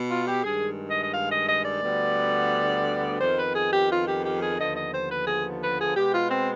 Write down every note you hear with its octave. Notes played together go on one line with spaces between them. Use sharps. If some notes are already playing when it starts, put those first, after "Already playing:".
Already playing: B2
F4
G4
G2 D#3 G#3 G#4
D#5
D#5
F5
D#5
D#5
D5
D2 D3 G3 B3
F2 D#3 B3 C5
B4
G#4
G4
F4
G4
G4
G#4
D#2 D3 F3 B3 D#5
D#5
C5
B4
G#4
B4
G#4
B2 G#3 B3 G4
F4
C4